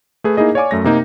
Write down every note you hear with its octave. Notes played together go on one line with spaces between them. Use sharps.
A3 G#4 B4
A#3 D#4 E4 G#4 D#5
C#5 D5 F5 G#5 C#6 D6
F#2 A3 A#6
C3 A#3 D#4